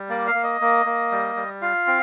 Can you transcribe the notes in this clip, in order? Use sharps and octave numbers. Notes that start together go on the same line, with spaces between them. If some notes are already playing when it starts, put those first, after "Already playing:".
Already playing: G3
A#3 D5
F5
A#3
D#5
A#3
A#3
G3
G3
F4 F5
C4